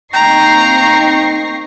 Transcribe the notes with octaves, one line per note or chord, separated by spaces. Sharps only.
A#3 C4 D#4 G5 A#5 C#6 A#6 C7